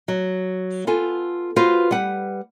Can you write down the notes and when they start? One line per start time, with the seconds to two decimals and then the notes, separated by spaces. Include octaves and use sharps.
0.08 F#3
0.87 B3 F4 A4 G#5
1.56 F4 F#4 B4 C5
1.91 G3 B4 F#5